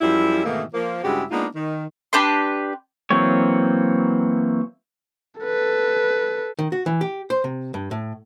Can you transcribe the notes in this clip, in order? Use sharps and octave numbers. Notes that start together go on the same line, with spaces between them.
F#2 F3 G3 E4
G#2 B2 D#3 E3 A3 A#3
F3 A#3
G2 C#3 G#3 E4 F#4 G4
G#3 A#3 B3 D4 D#4 F4
D#3
D4 G4 B4 C6
E3 F#3 A#3 C4 C#5
A4 B4
D#3
F#4
E3
G4
C5
C3
G2
A2